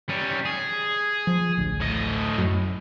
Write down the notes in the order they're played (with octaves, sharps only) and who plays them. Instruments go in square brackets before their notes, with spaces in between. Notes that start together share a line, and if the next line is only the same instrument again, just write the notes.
[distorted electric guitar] G3 C#4
G#4
[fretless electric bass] F3
A1 D2
[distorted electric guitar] A2 D#5
[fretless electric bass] F#2